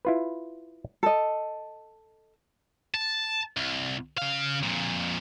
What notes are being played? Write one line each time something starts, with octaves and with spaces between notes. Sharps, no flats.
E4 F4 B4
A4 D#5
A5
C2
C#3 F5
F2 A#2